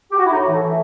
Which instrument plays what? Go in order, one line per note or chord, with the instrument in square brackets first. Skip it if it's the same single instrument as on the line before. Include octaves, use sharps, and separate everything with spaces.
[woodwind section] G4
F#4
E4
A2 D#4
F#4
E3
A4
A3